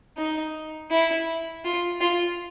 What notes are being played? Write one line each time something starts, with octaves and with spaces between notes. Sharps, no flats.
D#4
E4
F4
F4